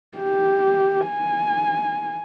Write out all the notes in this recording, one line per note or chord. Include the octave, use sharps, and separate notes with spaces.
G4
G#5